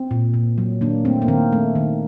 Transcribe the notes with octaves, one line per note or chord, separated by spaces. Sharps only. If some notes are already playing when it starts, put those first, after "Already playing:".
Already playing: C4
A#2
A#2
F#3
D#3 A#3 D4
A3 C4
A#3
D#3 C4
A3
D#3